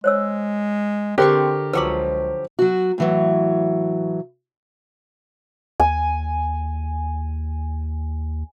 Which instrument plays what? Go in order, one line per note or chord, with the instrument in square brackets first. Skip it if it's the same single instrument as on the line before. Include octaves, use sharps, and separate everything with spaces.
[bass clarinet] G#3 [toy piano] C5 C#5 E6
[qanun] D3 C6 C#6 [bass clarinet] C4 [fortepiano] G4 A#4 [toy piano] G#4 C5
[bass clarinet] C#2 [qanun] F3 F#3 B5 [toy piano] B4 G5 D6
[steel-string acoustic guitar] F#3 F#4
A2 E3 F#3
[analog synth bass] D#2 [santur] G#5